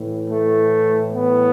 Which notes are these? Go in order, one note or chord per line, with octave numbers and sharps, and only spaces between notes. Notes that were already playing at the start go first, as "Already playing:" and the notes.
Already playing: A2 E3
A3
B3